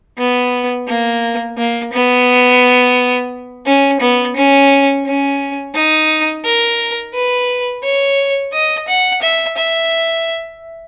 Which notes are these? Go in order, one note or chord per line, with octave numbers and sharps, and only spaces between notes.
B3
A#3
A#3
B3
C#4
B3
C#4
C#4
D#4
A#4
B4
C#5
D#5
F#5
E5
E5